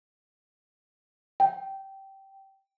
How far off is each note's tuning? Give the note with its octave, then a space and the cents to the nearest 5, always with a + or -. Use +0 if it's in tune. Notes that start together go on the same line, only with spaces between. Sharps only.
G5 -15